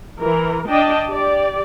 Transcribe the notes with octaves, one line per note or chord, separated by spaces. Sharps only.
E3 A#4
D4 D#5 G5 A5
G4 D5